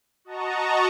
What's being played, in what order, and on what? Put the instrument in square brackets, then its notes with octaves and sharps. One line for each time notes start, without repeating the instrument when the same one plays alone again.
[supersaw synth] F#4 D#5 A5 A#5 C#6